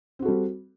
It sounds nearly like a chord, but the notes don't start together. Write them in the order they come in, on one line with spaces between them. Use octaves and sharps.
C4 F#4 A4 G3